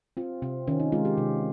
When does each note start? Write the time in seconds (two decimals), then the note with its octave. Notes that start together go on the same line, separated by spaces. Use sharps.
0.17 C4 F4
0.42 C3 C4
0.68 D#3 C#4
0.80 D#4
0.92 G#3 F4
1.05 G4
1.18 C3